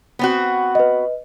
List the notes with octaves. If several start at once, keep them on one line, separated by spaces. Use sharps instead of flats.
B3 C4 F#4
B4 D#5